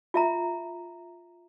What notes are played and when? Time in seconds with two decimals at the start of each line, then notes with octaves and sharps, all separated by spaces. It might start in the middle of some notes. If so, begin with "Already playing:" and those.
0.14 F4 E5 A#5